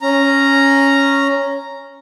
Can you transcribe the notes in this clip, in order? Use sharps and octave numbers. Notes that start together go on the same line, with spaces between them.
C#4 A#5